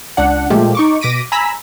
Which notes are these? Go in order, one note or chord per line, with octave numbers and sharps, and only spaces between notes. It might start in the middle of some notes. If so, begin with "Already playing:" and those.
C#2 D4 F#5
A#2 F3 G#3 A3 F4 G4
D#4 C#6 D6
B2 D6 A#6 B6 D7 D#7
G#5 A#5 B5 E6 B6